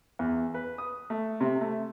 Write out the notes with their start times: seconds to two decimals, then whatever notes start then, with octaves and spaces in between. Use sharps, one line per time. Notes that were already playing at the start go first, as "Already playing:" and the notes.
0.19 E2
0.54 B4
0.78 D#6
1.10 A3
1.41 C3
1.61 A3